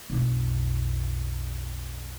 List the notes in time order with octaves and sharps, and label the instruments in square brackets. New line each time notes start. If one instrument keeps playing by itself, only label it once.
[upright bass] B1 F2